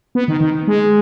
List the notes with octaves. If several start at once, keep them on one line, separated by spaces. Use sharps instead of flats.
B3
D#3
D#3
G#3